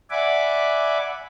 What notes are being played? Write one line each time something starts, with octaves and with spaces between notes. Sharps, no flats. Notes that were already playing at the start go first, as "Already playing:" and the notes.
D5 E5 F#5 G#5 B5 D6